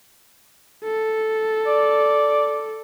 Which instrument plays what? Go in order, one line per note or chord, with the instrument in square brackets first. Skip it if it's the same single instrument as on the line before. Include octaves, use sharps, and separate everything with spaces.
[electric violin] A4
[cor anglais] D5